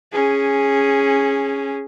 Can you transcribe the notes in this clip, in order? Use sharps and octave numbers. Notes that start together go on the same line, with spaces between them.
C#4 G#4